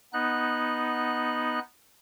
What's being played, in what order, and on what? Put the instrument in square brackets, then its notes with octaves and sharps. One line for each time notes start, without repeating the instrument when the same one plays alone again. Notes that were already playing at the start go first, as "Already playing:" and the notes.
[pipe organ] B3 D#4 F#6